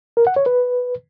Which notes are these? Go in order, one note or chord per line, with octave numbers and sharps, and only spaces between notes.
A#4
F#5
C#5
B4